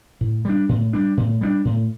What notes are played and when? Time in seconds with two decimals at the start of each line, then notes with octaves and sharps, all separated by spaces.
0.21 A2
0.45 G3 D4
0.69 A2
0.93 G3 D4
1.17 A2
1.41 G3 B3 D4
1.65 A2